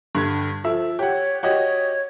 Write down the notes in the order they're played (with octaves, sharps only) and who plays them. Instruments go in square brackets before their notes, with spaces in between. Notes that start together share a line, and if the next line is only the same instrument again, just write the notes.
[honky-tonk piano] G2 D3 G#6
[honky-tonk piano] F3 E5 [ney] A4
[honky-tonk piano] G4 F#5 [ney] C#5
[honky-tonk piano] F#4 G4 D#5 [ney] C#5